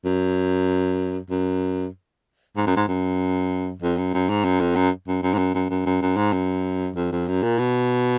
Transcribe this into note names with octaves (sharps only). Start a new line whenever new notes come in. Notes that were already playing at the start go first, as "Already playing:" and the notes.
F#2
F#2
G#2
F#2
G#2
F#2
F2
F#2
F#2
G#2
F#2
F2
F#2
F#2
F#2
G#2
F#2
F#2
F#2
F#2
F#2
G#2
F#2
F2
F2
F#2
A#2
B2